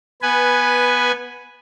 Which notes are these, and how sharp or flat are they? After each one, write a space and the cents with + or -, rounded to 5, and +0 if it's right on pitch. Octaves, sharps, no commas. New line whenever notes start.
B3 -10 B4 +0 G#5 +0